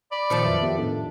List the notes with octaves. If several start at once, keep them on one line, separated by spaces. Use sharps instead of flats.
D5 B5
A#2 D#3 F3 C5 A5 C#7
F2 F#3 B4 E5
B3 G4
A2 D4 D#4 A4